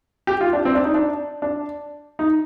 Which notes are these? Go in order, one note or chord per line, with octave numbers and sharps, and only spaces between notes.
G4
F4
D4
C4
D4
D#4
D4
D4
D#4